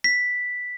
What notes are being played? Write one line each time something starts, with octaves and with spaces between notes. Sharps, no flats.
B6